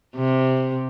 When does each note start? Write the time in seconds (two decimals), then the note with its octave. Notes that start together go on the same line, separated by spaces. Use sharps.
0.16 C3